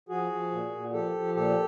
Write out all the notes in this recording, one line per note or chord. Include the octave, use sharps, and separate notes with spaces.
F3 F#4 G#4
F3
A#2
A#2
F3 G4 A4
F3
A#2 G4 A4